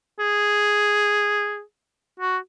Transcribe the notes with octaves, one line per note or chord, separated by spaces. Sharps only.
G#4
F#4